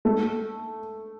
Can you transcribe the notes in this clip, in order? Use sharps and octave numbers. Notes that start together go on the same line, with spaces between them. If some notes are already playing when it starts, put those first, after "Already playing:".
A3